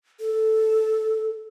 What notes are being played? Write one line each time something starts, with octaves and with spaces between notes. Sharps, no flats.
A4